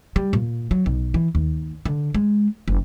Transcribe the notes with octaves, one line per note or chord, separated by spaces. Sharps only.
G3
A#2
F#3
B1
E3
D#2
D3
G#3
F#1